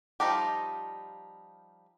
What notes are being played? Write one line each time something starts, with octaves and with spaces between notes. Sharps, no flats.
F3 G3 D#4 F4 G4